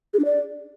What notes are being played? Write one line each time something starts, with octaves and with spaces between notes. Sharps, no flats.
G#4
D4
D5